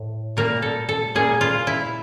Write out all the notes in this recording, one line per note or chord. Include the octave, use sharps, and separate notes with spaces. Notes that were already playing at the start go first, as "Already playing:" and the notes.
Already playing: A2
A#2 G3 A#3 A#4
A4
A4
A#2 G3 A#3 G#4
F4
E4